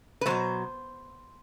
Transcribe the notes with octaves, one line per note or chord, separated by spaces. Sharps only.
B4
B2 F#3 A3 C5